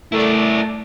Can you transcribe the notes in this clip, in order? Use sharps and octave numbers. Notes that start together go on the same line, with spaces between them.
A3 E4 A4 A#4 D5